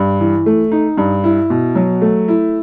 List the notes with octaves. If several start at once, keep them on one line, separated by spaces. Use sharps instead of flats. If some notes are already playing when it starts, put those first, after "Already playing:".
Already playing: G2
E3
A3
D#4
G2
E4
B2
F#3
A3
E4